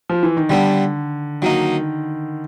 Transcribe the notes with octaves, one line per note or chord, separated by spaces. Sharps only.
F3
E3
D#3
D3 G3 B3 D4
D#3 F#3 A#3 D#4